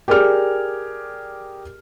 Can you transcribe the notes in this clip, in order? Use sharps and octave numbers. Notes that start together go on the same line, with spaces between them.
G4 G#4 A#4 D5 F6